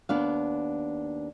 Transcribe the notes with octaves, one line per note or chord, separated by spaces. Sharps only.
D#2 B3 D4 F5